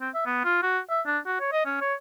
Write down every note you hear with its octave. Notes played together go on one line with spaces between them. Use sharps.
C4
E5
B3
F4
F#4
E5
D4
F#4
C#5
D#5
C#4
C#5